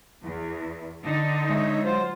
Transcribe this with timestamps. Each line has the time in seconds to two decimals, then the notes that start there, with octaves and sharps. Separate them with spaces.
0.23 E2
1.03 D3 D#4
1.50 G#3 C#5 E5
1.84 F#3 F4 C5